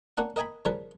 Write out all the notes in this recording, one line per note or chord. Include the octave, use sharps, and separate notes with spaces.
A#3 C#4 D4 F#5
A#4 D#5 G5 G#5 A#5 B5
C#3 F3 G3 A#4 B4